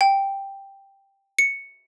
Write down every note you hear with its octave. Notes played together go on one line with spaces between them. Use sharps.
G5
C#7